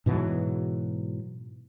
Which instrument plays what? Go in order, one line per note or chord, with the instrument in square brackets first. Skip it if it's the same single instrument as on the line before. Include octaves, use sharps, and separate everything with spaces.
[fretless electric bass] G#2 B2 E3 F#3